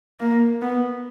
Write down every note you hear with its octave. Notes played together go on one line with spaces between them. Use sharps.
A#3
B3